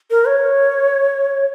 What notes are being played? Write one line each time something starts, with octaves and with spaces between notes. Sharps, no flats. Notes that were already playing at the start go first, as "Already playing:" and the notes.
A#4
C#5